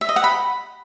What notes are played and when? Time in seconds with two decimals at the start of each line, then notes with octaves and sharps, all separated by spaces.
0.01 E5
0.09 D#5
0.16 F#5
0.24 B5